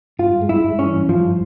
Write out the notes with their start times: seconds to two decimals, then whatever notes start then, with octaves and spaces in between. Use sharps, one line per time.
0.19 G2 F4
0.42 G#3
0.49 E4
0.64 G2
0.79 C#4
0.86 E3
1.09 G2 F3